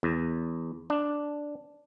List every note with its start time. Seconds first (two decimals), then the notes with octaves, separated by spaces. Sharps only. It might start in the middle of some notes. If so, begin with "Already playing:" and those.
0.03 E2
0.90 D4